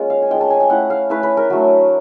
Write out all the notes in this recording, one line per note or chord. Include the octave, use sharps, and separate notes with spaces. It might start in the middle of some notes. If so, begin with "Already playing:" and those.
Already playing: G#3 A#3 C#4 F4
F5
G#5
G#3 C#4 F4 G5
A5
G#5
G5
A3 C#4 E4 F#5
F5
A3 C#4 E4 B4
B4
A#4
F#3 A3 D4